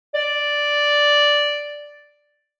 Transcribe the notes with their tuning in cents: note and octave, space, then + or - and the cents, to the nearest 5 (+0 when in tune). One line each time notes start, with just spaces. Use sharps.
D5 +0